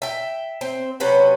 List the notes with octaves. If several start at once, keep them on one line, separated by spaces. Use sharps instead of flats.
E5 G5
C4
C3 F#3 C#4 B4